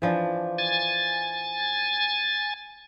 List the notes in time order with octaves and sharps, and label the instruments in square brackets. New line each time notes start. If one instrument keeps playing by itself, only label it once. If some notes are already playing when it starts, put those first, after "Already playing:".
[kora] E3 F3 D4
[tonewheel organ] G#5 A6